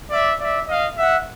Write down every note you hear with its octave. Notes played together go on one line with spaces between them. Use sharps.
D5 E5
D5 E5
D#5 F5
E5 F#5